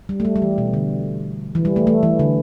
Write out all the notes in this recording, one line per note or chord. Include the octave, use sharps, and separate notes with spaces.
G3
A3
G3
G3
E3
B2
D3
E3
G3
A3
A3
E3
D3